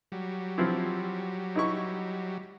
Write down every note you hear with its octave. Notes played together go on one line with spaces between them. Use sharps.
F#3 G3
F3 C4 E4
D#4 E4 C#6